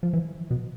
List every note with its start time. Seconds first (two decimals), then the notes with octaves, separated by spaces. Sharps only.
0.03 F3
0.13 E3
0.51 B2